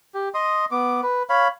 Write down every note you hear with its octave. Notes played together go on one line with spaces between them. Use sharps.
G4
D#5 C6 D#6
B3 D6
B4
C#5 F5 B5